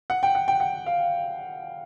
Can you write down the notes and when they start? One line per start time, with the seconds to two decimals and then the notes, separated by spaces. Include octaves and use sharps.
0.10 F#5
0.23 G5
0.35 F#5
0.48 G5
0.60 F#5
0.86 F5